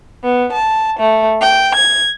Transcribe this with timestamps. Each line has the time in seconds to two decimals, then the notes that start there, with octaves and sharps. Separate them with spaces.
0.25 B3
0.55 A5
1.01 A3
1.41 G5
1.76 G#6